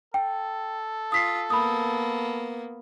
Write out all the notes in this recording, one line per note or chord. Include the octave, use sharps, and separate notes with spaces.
A4 G5
F4 D#6 B6 C7
A#3 B3 B5 D#6